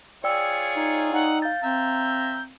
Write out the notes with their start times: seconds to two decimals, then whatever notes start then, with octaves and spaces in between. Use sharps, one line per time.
0.24 F4 G#4 C#5 D5 G5 E6 C#7
0.76 D#4
1.13 D#4 F#5
1.42 F5 G6 A6
1.63 C4 E5 A#5 G6